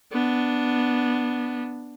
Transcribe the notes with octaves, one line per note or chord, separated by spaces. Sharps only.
B3 D4